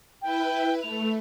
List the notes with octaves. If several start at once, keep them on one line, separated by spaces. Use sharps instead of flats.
E4 B4 G5
A3 F7